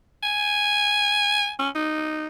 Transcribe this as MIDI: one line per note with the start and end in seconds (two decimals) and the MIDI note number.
0.23 1.52 80
1.59 1.69 61
1.75 2.27 63